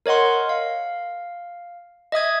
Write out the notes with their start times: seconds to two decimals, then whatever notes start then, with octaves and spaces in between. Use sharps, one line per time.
0.06 A#4 C#5 D#5 F#5 C6
0.49 F5
2.12 D#5 E5 D#6 G#6